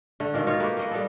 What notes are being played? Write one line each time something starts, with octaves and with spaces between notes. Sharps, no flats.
D3 A3
G#2 B2 D#3 A#3
D#4 F4 C#5
A3 A#3 G4 B4
A#3 D#5 F#5
G3 B3 A4